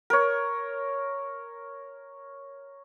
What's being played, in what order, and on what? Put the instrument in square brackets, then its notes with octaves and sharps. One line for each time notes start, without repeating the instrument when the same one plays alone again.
[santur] A#4 C#5